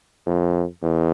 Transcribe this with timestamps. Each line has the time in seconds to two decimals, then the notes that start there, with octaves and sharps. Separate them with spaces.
0.27 F2
0.82 E2